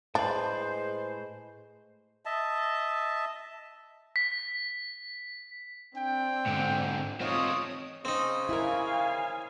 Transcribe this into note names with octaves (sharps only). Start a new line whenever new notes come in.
A2 G#3 D4 B4 C5
D#5 E5 A5
B6
C4 D4 G5
G#2 D3
C4 D#4 F4 C#5 D#6
C#3 C4 D#4
E4 A#4 F5 G#5